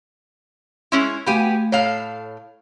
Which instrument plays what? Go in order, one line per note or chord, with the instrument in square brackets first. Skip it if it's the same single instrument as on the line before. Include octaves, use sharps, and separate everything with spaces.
[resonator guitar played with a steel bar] G#3 C#4 E4 [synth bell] C6
[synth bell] A3 F5 B5 [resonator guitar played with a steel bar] B3 G4 G#5
[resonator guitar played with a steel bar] A2 A4 F5 [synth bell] C#5